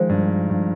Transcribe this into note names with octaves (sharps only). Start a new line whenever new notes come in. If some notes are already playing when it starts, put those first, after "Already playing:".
Already playing: D#3 F3 G#3
G2
G2